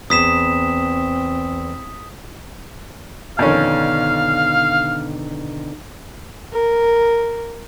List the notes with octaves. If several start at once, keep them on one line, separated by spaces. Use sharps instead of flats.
E2 C4 D#6 B6 E7
F2 B2 D3 D#3 C#4 F5
A#4